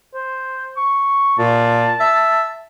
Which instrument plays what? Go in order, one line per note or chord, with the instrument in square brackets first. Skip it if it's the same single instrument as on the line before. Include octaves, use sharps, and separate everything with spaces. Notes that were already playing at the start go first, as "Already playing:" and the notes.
[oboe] C5
C#6
[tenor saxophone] A#2 [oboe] A5
[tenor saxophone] E5